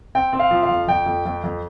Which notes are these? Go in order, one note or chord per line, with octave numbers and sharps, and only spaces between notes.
C4 G5
C4
F5
F3
F5
F2
F2 G5
F2
F2
F2